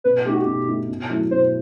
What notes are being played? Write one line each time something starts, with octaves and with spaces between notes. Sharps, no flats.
B2 B4
A3 D#4 G4
F#4
B2 G4
A3 D#4
B2
F#3 A3 E4
B2 C5